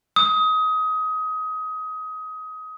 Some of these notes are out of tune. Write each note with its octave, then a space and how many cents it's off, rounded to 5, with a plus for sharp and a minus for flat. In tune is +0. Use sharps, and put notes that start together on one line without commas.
D#6 +25